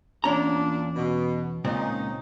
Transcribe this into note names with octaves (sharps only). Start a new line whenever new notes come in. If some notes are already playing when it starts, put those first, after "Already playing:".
E2 A#2 C#4 D4 A#5
B2
C#2 A#2 C4 C#4 D#4